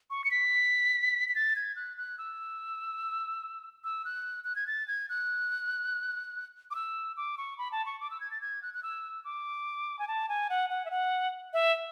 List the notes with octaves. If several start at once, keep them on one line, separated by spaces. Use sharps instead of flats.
C#6
C#7
B6
B6
A6
G#6
F#6
F#6
E6
E6
F#6
F#6
G#6
A6
G#6
F#6
D6
E6
D6
C#6
B5
A5
C#6
D6
E6
G#6
A6
G#6
F#6
F#6
E6
D6
G#5
A5
G#5
F#5
F#5
E5
F#5
E5